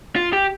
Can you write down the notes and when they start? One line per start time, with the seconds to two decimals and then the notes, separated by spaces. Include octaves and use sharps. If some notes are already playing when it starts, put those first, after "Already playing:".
0.16 F4
0.33 G4